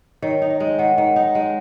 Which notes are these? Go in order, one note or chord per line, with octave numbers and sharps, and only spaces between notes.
D#3 C#5
D#4
D#5
G#3
D#3 F#5
D#3
F#5
D#4
G#3